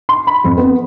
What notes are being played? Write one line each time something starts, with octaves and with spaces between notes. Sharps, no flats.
C6
B5
F2
B3